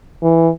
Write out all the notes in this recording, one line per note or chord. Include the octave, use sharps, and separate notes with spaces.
E3